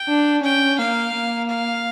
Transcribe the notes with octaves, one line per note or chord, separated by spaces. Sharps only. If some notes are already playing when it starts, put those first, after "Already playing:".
Already playing: G5
D4
C#4 G5
A#3 F5
A#3
F5